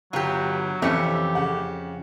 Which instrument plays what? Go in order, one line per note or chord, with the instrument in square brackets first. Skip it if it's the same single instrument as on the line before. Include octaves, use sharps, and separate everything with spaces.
[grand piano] G1 [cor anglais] F#3 [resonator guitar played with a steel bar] F4 G4
[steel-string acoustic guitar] F2 [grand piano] C3 E3 [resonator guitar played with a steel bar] A3 C#4 [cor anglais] G4
[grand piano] C#3 F#5